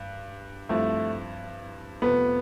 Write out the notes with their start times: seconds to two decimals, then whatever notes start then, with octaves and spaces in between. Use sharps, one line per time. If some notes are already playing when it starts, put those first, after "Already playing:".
Already playing: G2
0.69 G2 F3 A3 C4 E4
2.02 F2 C3 F3 A3 B3